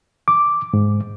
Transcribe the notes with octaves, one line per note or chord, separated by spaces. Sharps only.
D6
G#2